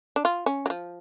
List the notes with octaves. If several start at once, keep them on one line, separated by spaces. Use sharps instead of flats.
D4
F4
C#4
F#3
F3